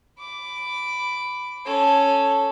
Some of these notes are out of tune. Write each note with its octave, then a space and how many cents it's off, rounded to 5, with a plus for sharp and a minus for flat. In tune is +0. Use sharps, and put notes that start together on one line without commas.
B5 +10 D6 -10
C#4 +0 A4 +0